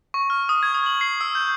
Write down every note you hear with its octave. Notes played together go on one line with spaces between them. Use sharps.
C#6
F6
D#6
G#6
D#6
F#7
C7
E6
G6